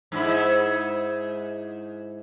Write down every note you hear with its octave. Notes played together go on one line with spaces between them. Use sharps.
G#2 E4